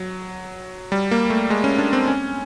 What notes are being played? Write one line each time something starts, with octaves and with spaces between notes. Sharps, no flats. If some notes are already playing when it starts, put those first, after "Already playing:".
Already playing: F#3
G3
A#3
A3
G#3
C#4
D4
C4
C#4